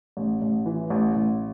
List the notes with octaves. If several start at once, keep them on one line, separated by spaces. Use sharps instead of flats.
A1
A1
E3
A1
A1